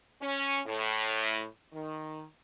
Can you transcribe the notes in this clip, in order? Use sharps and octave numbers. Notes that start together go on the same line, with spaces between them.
C#4
A2
D#3